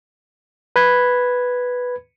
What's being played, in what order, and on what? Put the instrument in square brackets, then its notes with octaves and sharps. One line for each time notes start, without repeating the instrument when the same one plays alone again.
[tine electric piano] B4 B5 G#6